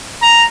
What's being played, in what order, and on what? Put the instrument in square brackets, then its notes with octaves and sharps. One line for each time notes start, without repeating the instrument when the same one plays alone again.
[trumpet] A#5